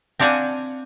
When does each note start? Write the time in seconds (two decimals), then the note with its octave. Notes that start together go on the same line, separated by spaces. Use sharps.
0.20 C4 D4 F5 F#5 G#5